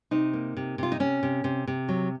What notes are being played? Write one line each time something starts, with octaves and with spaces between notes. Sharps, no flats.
C3 D#4
A#3
C3
C3 F4
D#4
C3 C#4
C3
C3
C3
F#3